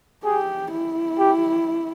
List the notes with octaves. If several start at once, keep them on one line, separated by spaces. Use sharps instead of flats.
G4 G#4
E4
G4